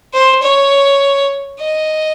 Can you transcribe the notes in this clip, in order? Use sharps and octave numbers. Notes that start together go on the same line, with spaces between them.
C5
C#5
D#5